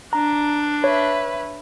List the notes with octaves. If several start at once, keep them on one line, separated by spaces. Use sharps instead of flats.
D4 A#5
B4 C#5 E5